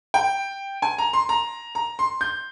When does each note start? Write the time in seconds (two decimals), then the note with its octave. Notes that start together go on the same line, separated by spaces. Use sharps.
0.14 G5
0.82 G#5
0.98 A#5
1.13 C6
1.29 A#5
1.75 A#5
1.99 C6
2.21 G6